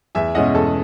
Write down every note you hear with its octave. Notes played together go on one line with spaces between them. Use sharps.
E2 E5 G#5
B2 G#3 C#4 E4 D#5 F#5
E2 A4